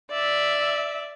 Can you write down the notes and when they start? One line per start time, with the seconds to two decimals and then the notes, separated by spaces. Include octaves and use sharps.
0.11 D5 E5